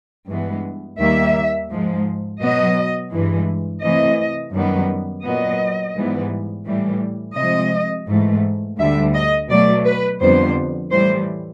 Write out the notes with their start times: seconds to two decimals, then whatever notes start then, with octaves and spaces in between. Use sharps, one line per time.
0.28 G2 E3 G#3 B3
0.99 D#2 D#3 G3 A#3 E5
1.70 G#2 F3 G#3
2.41 B2 F#3 B3 D#5
3.12 G2 E3 G#3
3.83 C3 E3 A3 D#5
4.53 F#2 D#3 G3 B3
5.24 A#2 F#3 B3 D#5
5.96 G#2 E3 G3 B3
6.66 A2 E3 G3
7.37 C3 F3 G#3 D#5
8.08 G#2 E3 A3
8.78 D2 D3 G3 E5
9.15 D#5
9.50 B2 F#3 A3 D5
9.85 B4
10.20 F2 D3 G3 B3 C5
10.91 A2 E3 G3 C5